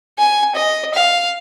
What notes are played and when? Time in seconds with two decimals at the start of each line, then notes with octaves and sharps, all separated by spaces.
0.19 G#5
0.55 D#5
0.94 F5